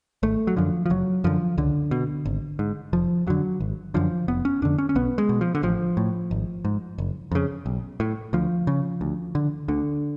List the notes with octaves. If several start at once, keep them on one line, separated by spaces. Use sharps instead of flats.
G#1 A3
F#3
F#2 D3 F3
F3
F#1 F#3
F#2 D3 F3
C#2 D3
B2
G#1
G#2
F1 F3
F2 D3 F#3
G#1
F#2 D3 F3
F1 B3
C#4
F2 D3 D4
C#4
C#4
B1 B3
G#3
B2
F3
D3
A1 F3
A2
G#1
G#2
F#1
F2 C#3
B1
A2
D2 F3
C#3
D2
D3
D2 D3